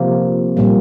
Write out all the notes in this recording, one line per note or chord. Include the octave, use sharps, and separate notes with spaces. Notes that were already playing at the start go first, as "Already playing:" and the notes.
Already playing: C3 F3 A#3
A#2 G3 A#3